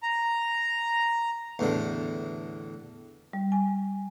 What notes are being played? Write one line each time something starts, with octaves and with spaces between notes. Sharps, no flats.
A#5
E2 A2 D3
G3
G#5